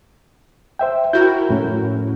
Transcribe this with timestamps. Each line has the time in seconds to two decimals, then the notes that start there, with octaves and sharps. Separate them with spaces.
0.79 C5 E5 G5
1.13 E4 F#4 A#4 G6
1.49 F2 A2 C#4